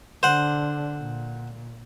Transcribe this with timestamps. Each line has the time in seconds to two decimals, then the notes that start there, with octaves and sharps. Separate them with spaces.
0.23 D3 D4 C5 F#5
1.00 A#2